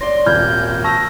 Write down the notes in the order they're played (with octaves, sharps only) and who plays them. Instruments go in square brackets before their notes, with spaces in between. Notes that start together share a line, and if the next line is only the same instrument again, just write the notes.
[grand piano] C#5 D5 [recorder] C6 [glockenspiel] A#6
[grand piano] D#1 G#1 [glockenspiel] B5 F6 G#6 [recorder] G6
[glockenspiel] A5 C#6 E6 [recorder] A#6